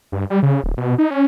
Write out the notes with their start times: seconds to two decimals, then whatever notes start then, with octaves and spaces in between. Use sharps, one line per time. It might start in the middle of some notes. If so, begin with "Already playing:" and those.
0.12 G2
0.30 G3
0.43 C#3
0.64 D1
0.77 B2
0.98 D#4
1.10 C#4